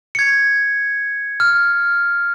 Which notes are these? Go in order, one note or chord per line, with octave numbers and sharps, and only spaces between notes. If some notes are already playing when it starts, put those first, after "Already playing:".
G#6 C#7
F6